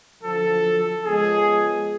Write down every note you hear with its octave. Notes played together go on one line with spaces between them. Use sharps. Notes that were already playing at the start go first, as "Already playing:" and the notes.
F#2 D3 F3 A4
C#3 F3 G#3 B3 G#4